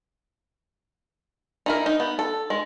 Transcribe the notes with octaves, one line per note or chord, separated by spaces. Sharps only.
D#4 E4 A#4
D#4
B3
A4
G#3